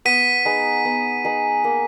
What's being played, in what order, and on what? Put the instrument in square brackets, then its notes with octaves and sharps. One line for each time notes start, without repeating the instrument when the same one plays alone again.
[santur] B3 [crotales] B6 D#7
[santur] D#4 G#4 B4
B3
D#4 G#4 B4
A#3